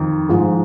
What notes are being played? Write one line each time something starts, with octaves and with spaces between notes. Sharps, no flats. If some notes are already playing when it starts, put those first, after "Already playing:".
Already playing: F2 D#3
G#2 F3